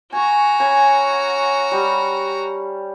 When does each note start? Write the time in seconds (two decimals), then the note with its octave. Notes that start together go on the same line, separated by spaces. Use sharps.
0.13 F#4 G#5 A#5 C#6
0.60 C#4 G#5 B5
1.71 G3